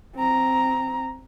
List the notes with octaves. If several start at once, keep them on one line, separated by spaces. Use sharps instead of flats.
C4 A#5